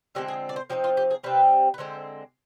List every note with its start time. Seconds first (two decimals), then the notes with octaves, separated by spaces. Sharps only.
0.15 D3 F3 G#3 C4 G4
0.28 G#4
0.49 D5
0.56 C5
0.70 F3 C4 D#4 G4
0.84 F4
0.97 G4
1.10 G#4
1.23 C3 G3 C4 D#4 B4
1.74 B4
1.78 D3 G#3 C4 C5